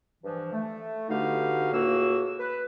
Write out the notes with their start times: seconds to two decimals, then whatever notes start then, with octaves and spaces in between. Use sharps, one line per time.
0.24 G2 E3 F3
0.53 A3
1.09 D3 B3 D#4 F#4 G4 F5
1.72 C#2 A2 A#3 F#4 G#4 E6
2.39 B4